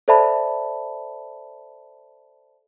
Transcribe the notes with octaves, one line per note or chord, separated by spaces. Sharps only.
A4 C5 D5 E5 A5 B5